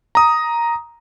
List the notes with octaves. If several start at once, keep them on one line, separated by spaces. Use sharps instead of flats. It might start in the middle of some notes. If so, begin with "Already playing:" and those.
A#5 D#6